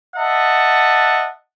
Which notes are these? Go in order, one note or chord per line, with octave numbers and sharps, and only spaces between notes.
D#5 E5 F#5 A5